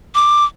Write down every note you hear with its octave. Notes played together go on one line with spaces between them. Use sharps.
D6